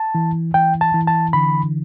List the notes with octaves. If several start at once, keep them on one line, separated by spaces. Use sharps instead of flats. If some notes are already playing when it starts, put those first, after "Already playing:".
Already playing: A5
E3
E3 G5
A5
E3
A5
D3 B5